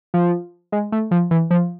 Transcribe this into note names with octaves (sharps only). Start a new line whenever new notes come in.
F3
G#3
A3
F3
E3
F3